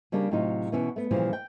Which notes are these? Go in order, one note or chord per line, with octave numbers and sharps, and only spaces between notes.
C#3 G3 A#3 D4
A2 C3 F#3 D#4 F4
B2 E3 C#4 F#4
A3 B3
A#2 C#3 E3 F3 G3
G5